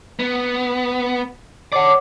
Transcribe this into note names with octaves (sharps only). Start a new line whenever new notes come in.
B3
C#5 D5 F#5 D6